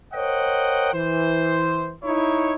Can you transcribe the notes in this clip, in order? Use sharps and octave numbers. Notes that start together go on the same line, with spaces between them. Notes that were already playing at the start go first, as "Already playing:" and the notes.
A#4 C5 C#5 D#5 F#5 G5
E3 C5
D#4 E4 C#5